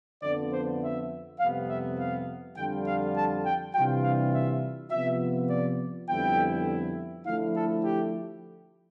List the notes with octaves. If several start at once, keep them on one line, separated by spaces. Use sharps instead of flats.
F2 D3 F3 B3 D5
C5
E5
F2 C3 G3 B3 F5
E5
F5
F2 D3 G3 D4 F4 G5
F5
A5
G5
C3 E3 G3 D4 F4 G5
F5
E5
C3 F3 B3 F4 E5
D5
F2 D3 G3 B3 E4 G5
D3 F3 A3 E4 F5
A4
G4